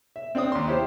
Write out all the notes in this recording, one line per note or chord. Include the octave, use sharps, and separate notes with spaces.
E5
C4 D4 G5 D#6
D#2 C6
E4 G4 C5